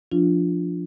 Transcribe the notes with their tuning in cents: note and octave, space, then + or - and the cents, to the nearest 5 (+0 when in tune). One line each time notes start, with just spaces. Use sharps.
F3 +0 D4 +0 F4 +0